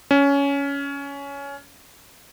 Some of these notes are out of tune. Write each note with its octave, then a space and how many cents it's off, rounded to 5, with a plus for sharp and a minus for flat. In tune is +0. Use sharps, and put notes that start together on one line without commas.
C#4 +15